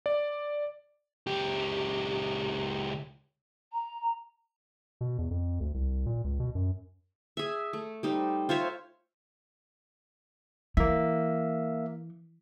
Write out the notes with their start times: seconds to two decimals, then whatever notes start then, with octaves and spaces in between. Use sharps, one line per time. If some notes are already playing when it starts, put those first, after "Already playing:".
0.06 D5
1.27 C#2 G4
3.73 A#5
5.01 B2
5.18 E2
5.30 F2
5.61 D2
5.74 C2
6.06 A#2
6.24 C#2
6.40 B2
6.55 F#2
7.37 G#4 E5
7.73 A3
8.03 G3 D#4 C5
8.49 F4 C5 C#5 E5
10.77 E3 A#3 E5